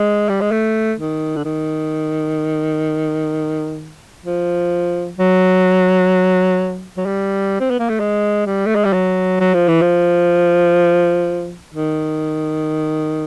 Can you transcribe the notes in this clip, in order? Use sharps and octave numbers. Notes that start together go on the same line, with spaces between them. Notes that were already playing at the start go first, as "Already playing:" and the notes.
Already playing: G#3
G3
G#3
A3
D#3
D3
D#3
F3
F#3
F#3
G3
C4
B3
A#3
A3
G#3
G3
A3
G#3
G3
F#3
F#3
F3
E3
F3
D#3